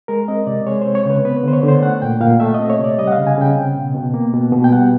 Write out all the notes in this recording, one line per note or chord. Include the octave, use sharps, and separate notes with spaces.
G#3 A#4
C4 D#5
C3 D5
G#3 C#5
C4 C5
C#5
C#3 B4
B3 B4
D3 C5
C#5
D3 C5
A3 F#5
A#2 G5
A#2 F5
A3 E5
D#5
C4
C#5
C3 D5
G3 D#5
F#5
F5
C#3
G#5
C#3 G5
C4
B2
B2
A#3
B2
B2
G5
G3 F#5